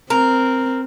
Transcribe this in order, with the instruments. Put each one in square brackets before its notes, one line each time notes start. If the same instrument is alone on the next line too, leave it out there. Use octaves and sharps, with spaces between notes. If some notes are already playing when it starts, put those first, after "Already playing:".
[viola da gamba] C4 [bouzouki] A#4